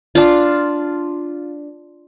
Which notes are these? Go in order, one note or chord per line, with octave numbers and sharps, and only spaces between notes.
D4 F4